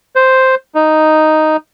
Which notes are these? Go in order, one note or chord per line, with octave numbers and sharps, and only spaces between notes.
C5
D#4